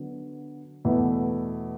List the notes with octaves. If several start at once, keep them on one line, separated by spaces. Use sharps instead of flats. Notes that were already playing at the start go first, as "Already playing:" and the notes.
Already playing: D3 F#3 B3
E2 B2 A3 E4